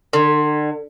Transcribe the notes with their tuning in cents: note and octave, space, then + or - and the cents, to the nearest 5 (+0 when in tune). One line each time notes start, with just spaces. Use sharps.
D3 +40